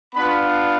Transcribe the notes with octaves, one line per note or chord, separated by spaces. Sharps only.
B3 D4 F4 B4 B5